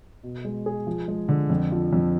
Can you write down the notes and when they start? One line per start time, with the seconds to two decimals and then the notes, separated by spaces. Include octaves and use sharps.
0.23 B2
0.45 G#3
0.66 G#4
0.87 F3
1.08 G#3
1.29 D3
1.50 F2
1.72 F3
1.93 F2